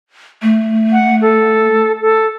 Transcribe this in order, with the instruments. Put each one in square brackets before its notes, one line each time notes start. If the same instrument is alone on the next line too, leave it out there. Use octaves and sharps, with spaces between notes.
[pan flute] A3
[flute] F#5
A4
A4